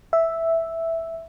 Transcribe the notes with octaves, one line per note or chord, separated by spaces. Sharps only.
E5